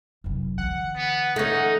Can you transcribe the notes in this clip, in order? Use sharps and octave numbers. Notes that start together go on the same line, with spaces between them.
F1 F#2
D3 E3 F#5
B3
A3 C#4 D#4